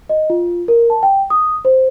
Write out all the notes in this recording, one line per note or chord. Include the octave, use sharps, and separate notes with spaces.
D#5
F4
A#4
A5
G5
D#6
C5